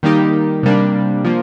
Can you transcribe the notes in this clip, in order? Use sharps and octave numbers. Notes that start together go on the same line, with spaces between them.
D#3 G3 A#3 D#4 G4
C3 G3 A#3 D4
F3 A#3